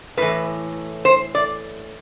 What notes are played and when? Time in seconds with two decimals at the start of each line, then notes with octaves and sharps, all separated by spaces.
0.17 A2 E3 B4
1.05 C5
1.35 D5